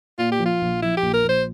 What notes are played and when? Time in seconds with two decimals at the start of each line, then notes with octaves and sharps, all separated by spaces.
0.18 A#2 F4
0.32 G4
0.39 F3
0.46 F4
0.61 A#1
0.83 F3 E4
0.97 G4
1.02 A#1
1.14 A#4
1.24 A#1
1.29 C5